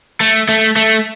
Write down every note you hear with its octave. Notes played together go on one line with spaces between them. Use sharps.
A3
A3
A3